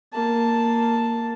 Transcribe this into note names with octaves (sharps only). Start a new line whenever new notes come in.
A#3 A5